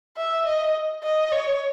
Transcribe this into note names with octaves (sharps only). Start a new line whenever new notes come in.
E5
D#5
D#5
C#5